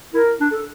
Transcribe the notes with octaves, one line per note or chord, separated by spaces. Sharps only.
E4 A#4
D4
A4